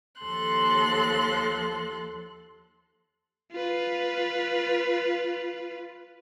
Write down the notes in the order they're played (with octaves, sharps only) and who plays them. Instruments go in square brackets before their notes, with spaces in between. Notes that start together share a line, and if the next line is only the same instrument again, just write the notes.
[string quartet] D#2 F3 A4 C6 F#6
[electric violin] F4 B4